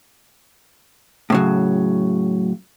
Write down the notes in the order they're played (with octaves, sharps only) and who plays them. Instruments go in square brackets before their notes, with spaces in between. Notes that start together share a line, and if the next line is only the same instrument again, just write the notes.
[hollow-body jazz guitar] A2 C#3 F#3